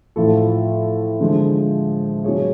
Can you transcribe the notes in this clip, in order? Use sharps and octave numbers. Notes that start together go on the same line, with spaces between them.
A2 F3 A3 F4 A4
D3 F3 G#3
F#3 C#4 G#4 C#5